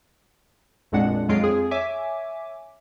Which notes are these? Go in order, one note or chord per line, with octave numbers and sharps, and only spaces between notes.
A1 F2 A#2 G#3 D4 F#5
F2 F#3 G#3 F4 C7 D7
F2 G#4
C#5 E5 G#5 D6